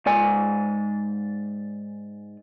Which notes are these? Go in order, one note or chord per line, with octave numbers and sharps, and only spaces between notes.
G#2 D5 G#5